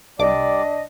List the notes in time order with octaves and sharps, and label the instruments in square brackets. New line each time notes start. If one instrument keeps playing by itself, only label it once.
[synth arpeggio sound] C2 D6 [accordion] G3 D5 [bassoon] D4 [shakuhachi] D#5